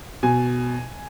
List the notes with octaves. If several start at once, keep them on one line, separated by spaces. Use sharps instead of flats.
B2 G#5